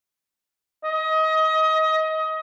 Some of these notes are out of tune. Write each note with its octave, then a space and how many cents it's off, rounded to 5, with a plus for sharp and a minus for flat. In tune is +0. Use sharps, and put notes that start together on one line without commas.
D#5 +25